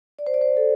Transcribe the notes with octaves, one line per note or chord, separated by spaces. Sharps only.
D5
C5
D5
C5
A4